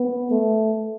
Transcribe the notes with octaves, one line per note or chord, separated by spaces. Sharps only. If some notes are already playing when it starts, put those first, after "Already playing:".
Already playing: B3
A3